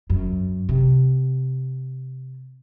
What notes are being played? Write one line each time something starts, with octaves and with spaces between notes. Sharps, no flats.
F#2
C3